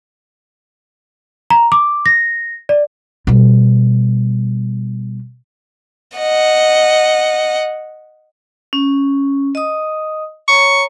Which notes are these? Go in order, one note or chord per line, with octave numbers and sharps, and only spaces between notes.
A#5
D6
A#6
D5
B2 G3
D#5 F#5
C#4
D#5 D#6
C#5 A#5 C#6